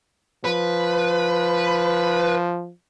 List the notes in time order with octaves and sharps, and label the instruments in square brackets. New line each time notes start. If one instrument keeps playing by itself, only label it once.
[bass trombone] F3 [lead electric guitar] B4